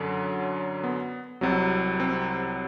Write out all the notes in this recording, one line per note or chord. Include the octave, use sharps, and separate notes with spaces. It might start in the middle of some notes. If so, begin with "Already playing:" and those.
Already playing: F#2 D3 F#3
B3
C2 C3 F#3
C4